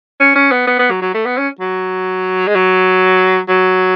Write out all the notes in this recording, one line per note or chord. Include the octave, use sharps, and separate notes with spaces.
C#4
C#4
B3
B3
B3
F#3
F#3
A3
B3
C#4
F#3
G#3
F#3
F#3